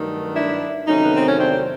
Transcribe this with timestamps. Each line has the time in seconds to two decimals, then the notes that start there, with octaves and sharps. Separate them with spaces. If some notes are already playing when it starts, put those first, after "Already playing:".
Already playing: G2 D#3 F#3 A3
0.34 D4 E4
0.87 E2 C3 D#3 F#3 A3 C#4 D#4
1.05 B3
1.16 C4
1.28 C#4
1.39 C4 D4